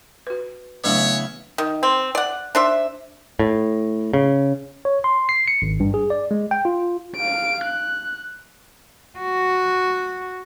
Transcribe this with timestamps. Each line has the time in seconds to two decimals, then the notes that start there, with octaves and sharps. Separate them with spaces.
0.27 F#4 B4
0.84 C#3 E3 F#3 A3 B3 D4 C#5
1.58 D#3
1.83 C4
2.15 D5 F#5
2.55 D4 C5 E5
3.39 A2
4.14 C#3
4.85 C#5
5.04 C6
5.29 C7
5.48 C#7
5.62 G#1
5.80 G2
5.94 G#4
6.10 D5
6.31 G#3
6.51 G5
6.65 F4
7.16 F5 D7
7.64 F#6
9.19 F#4